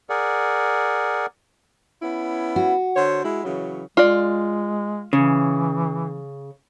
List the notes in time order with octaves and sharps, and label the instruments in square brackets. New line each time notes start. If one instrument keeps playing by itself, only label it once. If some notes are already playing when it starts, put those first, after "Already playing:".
[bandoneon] G#4 A#4 D5 F#5
[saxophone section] B3 C#4 E4
[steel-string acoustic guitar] F#4
[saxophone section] D3 C5 C#5
G#3 E4
C#3 E3 F#3
[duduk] G#3 [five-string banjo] F4 D5
[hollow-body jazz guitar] C#3 [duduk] E3